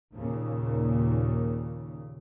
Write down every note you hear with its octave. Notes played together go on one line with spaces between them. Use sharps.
D#2 A#2 C#3